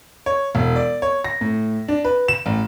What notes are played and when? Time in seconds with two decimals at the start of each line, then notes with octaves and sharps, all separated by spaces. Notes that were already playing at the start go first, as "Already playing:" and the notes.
0.26 C#5
0.55 E1
0.76 D5
1.02 C#5
1.24 A#6
1.41 A2
1.88 D4
2.05 B4
2.28 E7
2.46 A1